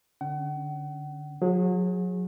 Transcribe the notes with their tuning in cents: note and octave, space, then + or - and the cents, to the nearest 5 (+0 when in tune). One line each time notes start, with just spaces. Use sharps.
D3 +0 C#4 +0 F#5 +40
F#3 -35 G#4 -15